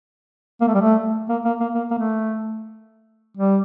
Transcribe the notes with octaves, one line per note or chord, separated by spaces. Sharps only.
A#3
A3
G3
A3
A#3
A#3
A#3
A#3
A#3
A3
G3